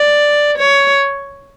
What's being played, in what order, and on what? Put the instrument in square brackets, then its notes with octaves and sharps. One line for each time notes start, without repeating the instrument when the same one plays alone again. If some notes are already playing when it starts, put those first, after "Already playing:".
Already playing: [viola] D5
C#5